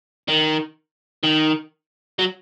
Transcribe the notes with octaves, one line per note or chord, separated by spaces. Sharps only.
D#3
D#3
F#3